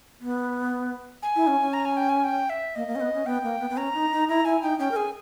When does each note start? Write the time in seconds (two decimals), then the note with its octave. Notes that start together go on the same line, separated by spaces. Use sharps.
0.21 B3
1.23 G#5
1.36 E4
1.47 C#4
1.61 C#4
1.73 A#5
1.85 G#5
1.97 G5
2.09 G#5
2.24 G5
2.50 E5
2.75 A#3 D#5
2.88 A#3
2.95 C#4
3.01 B3
3.14 C#4
3.26 B3 G5
3.44 A#3
3.60 B3
3.70 B3
3.77 C#4 A#5
3.94 D#4
4.12 D#4
4.29 E4 A#5
4.45 E4 G#5
4.62 D#4 G5
4.79 C#4 G5
4.91 A#4
4.96 G#4 G#5